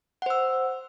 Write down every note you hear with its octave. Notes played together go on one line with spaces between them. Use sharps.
C5 F#5 E6